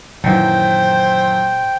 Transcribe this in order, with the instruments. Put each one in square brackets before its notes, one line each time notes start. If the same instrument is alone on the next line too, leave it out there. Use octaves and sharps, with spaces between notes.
[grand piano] F#2 D#3 E3 [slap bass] A#2 [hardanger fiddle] C5 [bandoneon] G5